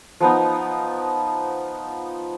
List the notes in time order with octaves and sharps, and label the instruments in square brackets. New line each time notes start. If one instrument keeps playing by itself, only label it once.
[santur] F3 B3 D#4